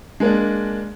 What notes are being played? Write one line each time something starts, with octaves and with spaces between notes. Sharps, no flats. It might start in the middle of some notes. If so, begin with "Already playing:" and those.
G#3 A#3 D4